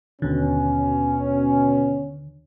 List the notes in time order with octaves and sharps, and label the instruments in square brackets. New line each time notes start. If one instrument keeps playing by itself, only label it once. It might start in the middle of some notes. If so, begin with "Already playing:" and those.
[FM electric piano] D#2 D3 [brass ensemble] B2 C#4